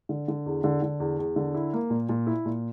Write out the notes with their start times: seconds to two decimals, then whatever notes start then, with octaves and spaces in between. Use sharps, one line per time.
0.09 D3
0.28 D3
0.46 E2
0.64 D3
0.82 D3
1.00 E2
1.19 E2
1.36 D3
1.55 E4
1.73 A#3
1.90 A#2
2.09 A#2
2.27 E4
2.46 A#2